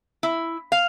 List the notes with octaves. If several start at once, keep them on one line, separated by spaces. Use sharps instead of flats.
E4
F5